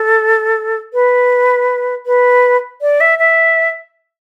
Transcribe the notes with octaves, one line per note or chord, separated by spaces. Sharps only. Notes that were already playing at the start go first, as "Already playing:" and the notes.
Already playing: A4
B4
B4
D5
E5
E5